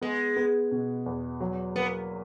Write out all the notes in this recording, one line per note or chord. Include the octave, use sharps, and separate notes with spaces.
G#3 B3
B3
B2
E2
F#3
A#3 B3